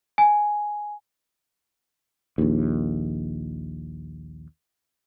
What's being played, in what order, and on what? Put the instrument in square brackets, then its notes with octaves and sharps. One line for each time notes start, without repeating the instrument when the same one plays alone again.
[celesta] G#5
[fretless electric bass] A#1 D#2